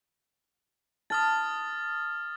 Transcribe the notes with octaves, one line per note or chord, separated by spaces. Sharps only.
A5 D#6 F6 A6